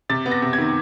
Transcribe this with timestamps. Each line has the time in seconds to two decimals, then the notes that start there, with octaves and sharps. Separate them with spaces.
0.09 C3 A6
0.26 B3
0.31 A#6
0.42 C3
0.53 G#6
0.59 D#3